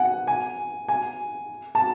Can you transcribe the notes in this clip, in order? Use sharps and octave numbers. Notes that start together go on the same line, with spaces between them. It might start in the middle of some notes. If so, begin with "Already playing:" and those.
Already playing: F#5 G#5
G#5
G#5
A5